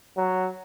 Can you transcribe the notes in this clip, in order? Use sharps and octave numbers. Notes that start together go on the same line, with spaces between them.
F#3